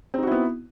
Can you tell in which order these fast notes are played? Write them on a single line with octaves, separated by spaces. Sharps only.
C4 D#4 F#4 E4 B3